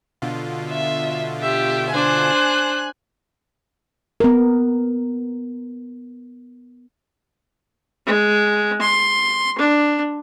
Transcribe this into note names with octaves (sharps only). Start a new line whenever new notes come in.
B2 D3 F4
E5
G4 E5
D4 C5 G#5 F#6
B3 A#4
G#3
C6
D4